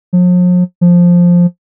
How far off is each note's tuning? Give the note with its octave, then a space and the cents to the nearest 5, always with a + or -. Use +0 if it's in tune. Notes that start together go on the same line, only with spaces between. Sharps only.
F3 +45
F3 +5